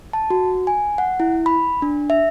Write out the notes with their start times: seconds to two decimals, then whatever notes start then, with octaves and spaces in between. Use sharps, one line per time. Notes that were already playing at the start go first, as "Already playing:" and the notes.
0.13 A5
0.30 F#4
0.67 G#5
0.98 F#5
1.20 E4
1.46 B5
1.82 D4
2.10 E5